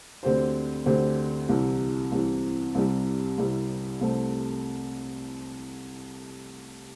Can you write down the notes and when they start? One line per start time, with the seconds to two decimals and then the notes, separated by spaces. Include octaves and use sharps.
0.23 D2 D3 C4 G4 C5
0.86 D2 D3 C4 G4 C5
1.49 C2 C3 E3
2.12 C2 C3 E3
2.75 C2 C3 G3 E4
3.38 C2 C3 G3 E4
4.01 C2 C3 A3 C4